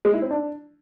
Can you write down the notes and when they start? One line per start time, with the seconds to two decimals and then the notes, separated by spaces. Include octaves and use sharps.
0.05 G#3
0.13 E4
0.22 C4
0.31 D4